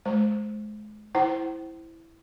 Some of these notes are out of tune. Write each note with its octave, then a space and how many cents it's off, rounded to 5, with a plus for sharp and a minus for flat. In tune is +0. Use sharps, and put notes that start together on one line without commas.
G#3 +35 C5 +0
E4 +0 C5 +0 G5 -40